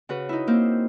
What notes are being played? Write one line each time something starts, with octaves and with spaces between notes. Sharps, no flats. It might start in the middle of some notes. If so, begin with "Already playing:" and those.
C#3 F#4 B4
D#4 E4
A#3 C4 C5